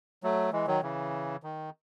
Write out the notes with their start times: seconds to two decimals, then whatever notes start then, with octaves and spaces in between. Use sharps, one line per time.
0.23 F#3 A3
0.53 E3 G#3
0.67 D#3 F#3
0.83 C#3 E3
1.43 D#3